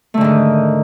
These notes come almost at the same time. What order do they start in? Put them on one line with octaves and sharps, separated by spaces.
A3 D3 G#2 D#3